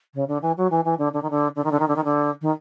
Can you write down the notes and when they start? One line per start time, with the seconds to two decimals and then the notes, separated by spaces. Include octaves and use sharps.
0.14 C#3
0.28 D3
0.42 E3
0.57 F#3
0.70 E3
0.84 E3
0.98 D3
1.13 D3
1.22 D#3
1.30 D3
1.55 D3
1.64 D#3
1.71 D3
1.79 D#3
1.88 D3
1.96 D#3
2.04 D3
2.41 D#3